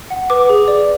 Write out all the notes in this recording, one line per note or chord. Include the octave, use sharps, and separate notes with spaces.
F#5
B4 D6
G#4
D5